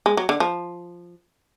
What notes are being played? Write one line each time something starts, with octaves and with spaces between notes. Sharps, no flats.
G#3
F#3
D3
F3